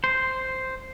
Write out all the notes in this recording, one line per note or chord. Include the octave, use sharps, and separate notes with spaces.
C5